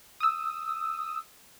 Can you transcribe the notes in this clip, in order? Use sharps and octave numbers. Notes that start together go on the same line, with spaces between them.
D#6 E6